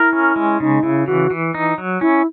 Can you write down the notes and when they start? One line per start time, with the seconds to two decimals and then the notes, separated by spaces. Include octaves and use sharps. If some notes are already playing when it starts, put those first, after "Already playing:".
Already playing: E4 A#4
0.13 C#4
0.36 G#3
0.60 C#3 D#4
0.83 C#3 E4
1.07 E3 F#4
1.31 E3
1.54 D#4
1.78 F#3
2.01 C#4 E4